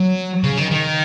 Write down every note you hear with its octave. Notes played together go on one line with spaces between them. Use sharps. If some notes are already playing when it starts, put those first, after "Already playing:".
Already playing: F#3
C#3
D#3
D#3